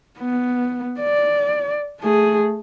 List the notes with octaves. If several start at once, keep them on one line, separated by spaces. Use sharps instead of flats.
B3
D5
A3 G#4